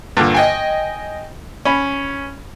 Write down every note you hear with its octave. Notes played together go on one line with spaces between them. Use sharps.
G2 A#2 D3
D#5 G5 G#5
C#4 B5